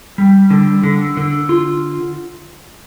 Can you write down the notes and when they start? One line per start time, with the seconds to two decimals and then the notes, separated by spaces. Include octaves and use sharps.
0.18 G3
0.50 D3
0.84 D3
1.17 D3
1.49 F4